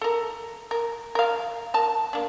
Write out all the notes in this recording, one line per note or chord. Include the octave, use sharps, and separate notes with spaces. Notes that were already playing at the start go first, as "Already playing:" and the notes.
A4 A#4
A#4
A#4 F5
A#4 A5
A#3 D4